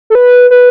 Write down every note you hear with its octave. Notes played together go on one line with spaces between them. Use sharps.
A4
B4
B4